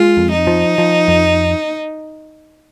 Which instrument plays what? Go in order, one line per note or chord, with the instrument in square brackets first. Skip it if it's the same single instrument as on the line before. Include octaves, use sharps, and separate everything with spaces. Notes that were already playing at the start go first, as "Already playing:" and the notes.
Already playing: [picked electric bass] G#3 [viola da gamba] F4
[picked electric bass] F2
[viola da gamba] D#4
[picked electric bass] F3
F3
F2